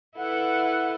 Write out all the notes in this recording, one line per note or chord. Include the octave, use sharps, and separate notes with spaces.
E4 A4 B4 F#5